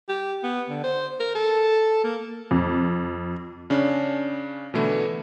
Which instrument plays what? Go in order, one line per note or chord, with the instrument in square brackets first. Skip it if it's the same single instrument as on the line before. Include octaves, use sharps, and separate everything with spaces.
[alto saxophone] G4
B3
D3
C5
A#4
A4
A#3
[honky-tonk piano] F2
[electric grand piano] C#3 C#4 D4
B2 D3 E3 A3 E4